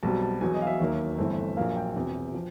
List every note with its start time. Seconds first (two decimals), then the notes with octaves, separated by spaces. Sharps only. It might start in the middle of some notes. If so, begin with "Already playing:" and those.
0.03 B1 B2 G3 C4 A5
0.22 A5
0.41 E1 E2 B2 F#3 G#5
0.54 D#5
0.62 F5
0.67 E5
0.80 D#2 D#3 F#3 A#3
1.18 G1 G2 E3 A3 C4
1.57 A#1 A#2 F#3 A#3 F5
1.76 G5
1.96 E1 E2 C3
2.34 F3